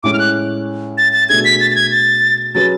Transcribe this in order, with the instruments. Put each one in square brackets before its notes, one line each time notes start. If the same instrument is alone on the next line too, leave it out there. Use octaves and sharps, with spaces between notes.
[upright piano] A2 G#3 C#4 [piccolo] D6
[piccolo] F6
F#6
A6
A6
[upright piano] B2 A3 D4 G#4 [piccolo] G#6
[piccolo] B6
A6
A6
G#6
A6
[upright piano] F#3 C#4 G#4 B4 [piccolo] A6